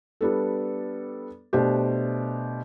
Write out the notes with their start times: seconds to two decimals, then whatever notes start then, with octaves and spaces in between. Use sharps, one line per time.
0.21 G3 B3 D4 A4
1.53 B2 A3 D4 G4 C5